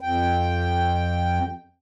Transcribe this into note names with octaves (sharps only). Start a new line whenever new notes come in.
F2 G5